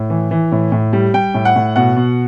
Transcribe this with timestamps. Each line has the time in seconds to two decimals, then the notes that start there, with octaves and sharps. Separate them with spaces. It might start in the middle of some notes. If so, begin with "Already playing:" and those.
Already playing: A2
0.10 E3
0.31 E3
0.52 A2
0.72 A2
0.93 G3
1.14 G3 G5
1.34 A2
1.45 F#5
1.56 A2
1.76 B2 F#5
1.96 B2